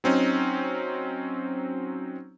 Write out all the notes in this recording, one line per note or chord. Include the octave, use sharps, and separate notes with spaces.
F#3 C4 C#4 D#4